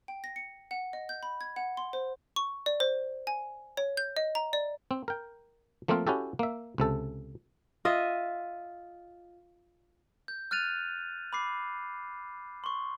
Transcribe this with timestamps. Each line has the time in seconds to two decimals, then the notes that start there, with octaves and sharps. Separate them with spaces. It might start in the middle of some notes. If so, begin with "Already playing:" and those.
0.08 G5
0.24 A#6
0.36 C#7
0.71 F#5
0.93 D#5
1.09 G6
1.23 B5
1.41 G#6
1.56 F#5
1.77 C6
1.93 C5
2.36 C#6
2.66 D5
2.80 C5
3.27 G#5
3.77 C#5
3.97 G6
4.17 D#5
4.35 A#5
4.53 D5
4.91 C4
5.08 A#4 G5
5.88 F3 A3 A#3 C4 F4
6.07 C#4 E4 F#4 G4 A4
6.39 A#3 E5
6.78 C#2 C3 A4
7.85 F4 D#5 E5
10.28 G6
10.51 F6 F#6 A6 D#7 F7
11.33 B5 D6 C7
12.64 C6 C#6